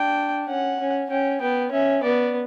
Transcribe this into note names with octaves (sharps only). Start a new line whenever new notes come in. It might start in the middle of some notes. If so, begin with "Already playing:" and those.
Already playing: D4 G5
C#4 F#5
C#4
C#4 G5
B3 G5
C#4 E5
B3 D5